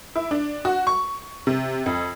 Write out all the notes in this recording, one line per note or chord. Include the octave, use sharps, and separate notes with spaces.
E4
D4
F#4
C#6
C3
F2